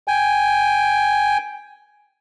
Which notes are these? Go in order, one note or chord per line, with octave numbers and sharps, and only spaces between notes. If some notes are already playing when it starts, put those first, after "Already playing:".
G5 G#5